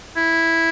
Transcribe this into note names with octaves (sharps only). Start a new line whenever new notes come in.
E4